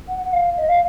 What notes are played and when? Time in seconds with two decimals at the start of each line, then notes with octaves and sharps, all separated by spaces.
0.08 F#5
0.25 F#5
0.33 F5
0.57 D#5
0.69 F5